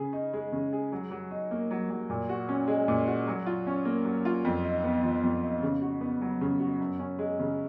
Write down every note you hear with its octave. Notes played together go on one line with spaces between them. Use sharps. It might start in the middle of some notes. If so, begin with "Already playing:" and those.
Already playing: C#3 G#4
D#4
G#3
C#3
G#4
F#3
F#3
D#4
A#3
F#3
F#3
A#2
F#4
C#4
G#3
A#2
F#4
F#3
F4
C#4
A#3
F#3
F4
F2
D#4
B3
F3
F2
D#4
C#3
F#4
B3
F#3
C#3
F#4
F#2
C#4
G#3
C#3